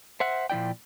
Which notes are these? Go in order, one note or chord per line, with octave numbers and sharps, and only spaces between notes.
C5 E5 F#5
A#2 F3 E4 D5 G5